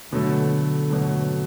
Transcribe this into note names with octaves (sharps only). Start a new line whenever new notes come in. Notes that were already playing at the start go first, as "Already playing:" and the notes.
B2 D3 F#3 A3
B2 F#3 A3